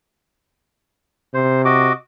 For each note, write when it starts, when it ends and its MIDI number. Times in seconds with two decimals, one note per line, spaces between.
1.34 1.91 48
1.34 1.62 72
1.65 1.93 66
1.65 1.93 75
1.65 1.93 86